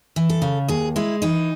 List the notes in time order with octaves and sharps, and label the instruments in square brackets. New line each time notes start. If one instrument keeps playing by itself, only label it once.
[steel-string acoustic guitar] E3
A4
C#3
D#2 G#4
G#3 E4
E3 D#4